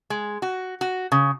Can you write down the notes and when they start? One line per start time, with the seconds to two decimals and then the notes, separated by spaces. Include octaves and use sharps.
0.10 G#3
0.42 F#4
0.81 F#4
1.12 C#3